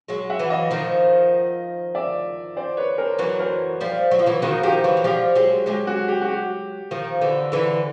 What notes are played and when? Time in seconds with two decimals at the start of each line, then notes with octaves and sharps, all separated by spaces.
0.08 F#3 G#3
0.30 E5 F#5
0.39 E3 F#3
0.50 D#5 F5
0.71 D#3 F3
1.95 D5 E5
2.56 C5 D5
2.77 B4 C#5
2.98 A#4 C5
3.19 E3 F#3 B4 C#5
3.39 A#4 C5
3.81 F3 G3
4.11 F#3
4.19 F3
4.26 E3 F#3
4.42 D#3 F3 F#4
4.63 D#3 F3 G4
4.84 E3 F#3
4.97 F#3
5.04 F3 G3 G4
5.35 F#3 G#3
5.66 F#3 G#3 G4
5.87 F#4
6.08 G4
6.21 F#4
6.28 G4
6.91 D#3 F3
7.21 D3 E3
7.52 D3 E3